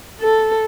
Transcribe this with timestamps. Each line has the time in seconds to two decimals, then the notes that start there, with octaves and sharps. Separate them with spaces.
0.21 A4